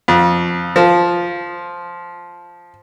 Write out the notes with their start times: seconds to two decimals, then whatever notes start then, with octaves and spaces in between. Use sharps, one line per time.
0.08 F2
0.76 F3